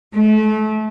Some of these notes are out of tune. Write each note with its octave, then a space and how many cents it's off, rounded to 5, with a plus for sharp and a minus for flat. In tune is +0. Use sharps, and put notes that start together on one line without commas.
A3 -30